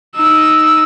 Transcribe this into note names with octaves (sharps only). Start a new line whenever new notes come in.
D#4 E6